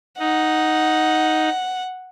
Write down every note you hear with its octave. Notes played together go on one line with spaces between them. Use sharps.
D#4 F#5